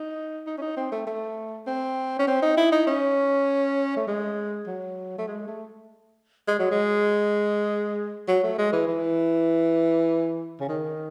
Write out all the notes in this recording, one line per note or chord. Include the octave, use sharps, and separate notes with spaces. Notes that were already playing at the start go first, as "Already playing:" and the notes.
Already playing: D#4
D#4
C#4
D#4
C4
A3
A3
C4
C#4
C4
D#4
E4
D#4
C#4
A3
G#3
F#3
A3
G#3
A3
G#3
F#3
G#3
F#3
A3
G#3
E3
E3
C#3
D#3